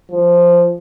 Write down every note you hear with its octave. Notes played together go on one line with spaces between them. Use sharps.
F3